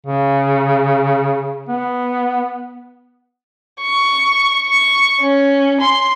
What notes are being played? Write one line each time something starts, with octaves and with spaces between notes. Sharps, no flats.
C#3
B3
C#6
C#6
C#4
C6